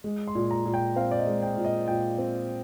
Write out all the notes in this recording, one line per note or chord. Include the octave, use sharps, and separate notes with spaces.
G#3
C6
A#2
A#5
A#2
G5
C4 F5
D5
D#5
G#3
G5
A#2
D#5
A#2 G5
C4